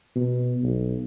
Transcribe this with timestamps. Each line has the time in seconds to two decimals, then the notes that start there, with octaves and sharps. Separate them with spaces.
0.16 B2
0.63 B1